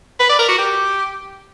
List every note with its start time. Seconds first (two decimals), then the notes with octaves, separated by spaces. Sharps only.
0.20 B4
0.29 D5
0.39 A#4
0.49 F#4
0.58 G4